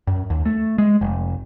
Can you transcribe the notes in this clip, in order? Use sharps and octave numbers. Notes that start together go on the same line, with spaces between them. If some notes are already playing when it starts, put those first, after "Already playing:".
F#2
D#2
A3
G#3
F1